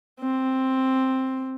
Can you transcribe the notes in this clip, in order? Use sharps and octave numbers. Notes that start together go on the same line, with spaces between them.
C4